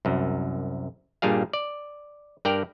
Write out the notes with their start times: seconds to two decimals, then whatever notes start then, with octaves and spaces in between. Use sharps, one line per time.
0.05 C2 F#2
1.22 G2 A#2 G3 G#4 F5
1.53 D5
2.45 G2 A#4 D5 G5 A#5